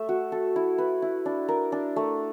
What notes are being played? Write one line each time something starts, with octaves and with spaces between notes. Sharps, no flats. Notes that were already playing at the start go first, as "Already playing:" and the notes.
Already playing: A3 E5
F#4
A4
E4
B4
E4
D4
A#4
D4
A3